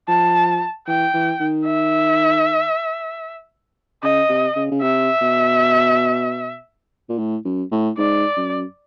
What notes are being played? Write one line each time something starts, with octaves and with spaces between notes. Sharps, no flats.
F3 A5
E3 G5
E3
D#3
E5
C#3 D#5
C3
C#3
C#3
C3 E5
B2
A#2
A2
F#2
A2
G#2 D5
F#2